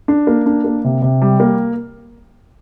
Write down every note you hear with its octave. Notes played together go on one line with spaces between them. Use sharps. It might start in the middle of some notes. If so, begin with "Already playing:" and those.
D4
A#3
D4
A#3
C3
C3
G3
A#3